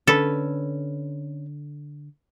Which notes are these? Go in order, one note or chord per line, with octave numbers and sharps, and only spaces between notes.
D3 C#4 A4 B4